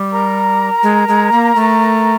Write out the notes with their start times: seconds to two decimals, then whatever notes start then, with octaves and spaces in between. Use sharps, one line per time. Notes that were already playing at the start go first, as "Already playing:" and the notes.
Already playing: G3
0.11 A#4 A#5
0.83 G#3
1.08 G#3
1.32 A#3
1.56 A3